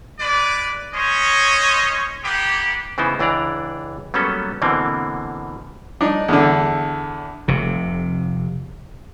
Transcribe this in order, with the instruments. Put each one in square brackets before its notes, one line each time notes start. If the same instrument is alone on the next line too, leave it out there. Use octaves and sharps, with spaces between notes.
[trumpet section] G#3 B4 D5
C#4 C5 C#5 D#5
A#3 B3 G4
[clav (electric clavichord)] C#3 E3 B3 D#4 E4 C5
C#2 E3 D4 D5 A#5
F#3 G3 A#3 B3 C#4 A4
B2 D3 E3 A#3 C4
[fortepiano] D4 D#4
E2 D3
[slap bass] F1 C3